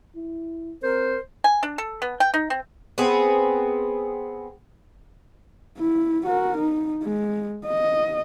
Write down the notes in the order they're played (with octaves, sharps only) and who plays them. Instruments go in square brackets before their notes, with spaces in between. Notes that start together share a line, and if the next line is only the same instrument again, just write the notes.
[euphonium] E4
[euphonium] C4 [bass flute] A#4 [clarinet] C5
[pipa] G#5
D4
A4
B3
G5
D#4
C4
[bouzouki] B3 C4 G#4
[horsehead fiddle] E4
F#4 A#4
D#4
G#3
D#5